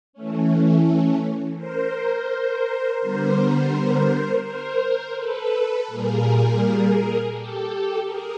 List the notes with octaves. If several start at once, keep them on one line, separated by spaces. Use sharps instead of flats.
E3 A3 C#4
A#4 C5
D3 G3 B3 A#4 C5
A#4 C5
A4 B4
A#2 G3 A#3 G#4 A#4
G4 A4
G#4 A#4